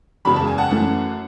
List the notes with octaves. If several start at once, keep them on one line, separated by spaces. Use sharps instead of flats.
F#1 E2 C#3 G#3 B5
A5
G#5
F#5 A5
F#2 E3 A3 C#4